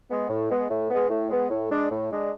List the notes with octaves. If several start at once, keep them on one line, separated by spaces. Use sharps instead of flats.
G#3 B3
A2
G#3 B3
A2
G#3 B3
A2
G#3 B3
A2
G#3 D4
A2
G#3 D4